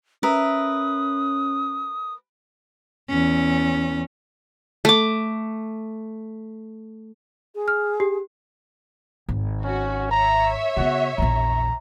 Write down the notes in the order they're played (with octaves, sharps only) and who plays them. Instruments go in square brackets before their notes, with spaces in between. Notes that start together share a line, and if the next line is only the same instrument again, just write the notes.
[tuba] C#4 [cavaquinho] A#4 B4 E5 [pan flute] D#6
[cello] E2 C#4
[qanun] A3 D6
[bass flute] G#4
[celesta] F6
G4
[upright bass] G#1
[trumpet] C#4 [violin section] F#4
[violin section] C#5 E5 [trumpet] A#5
[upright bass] C#3 B3 [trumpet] F#4
[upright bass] A#1 E2 [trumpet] A#5